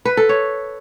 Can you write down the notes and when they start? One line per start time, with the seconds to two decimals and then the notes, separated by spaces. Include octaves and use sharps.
0.05 B4
0.17 A4
0.29 C#5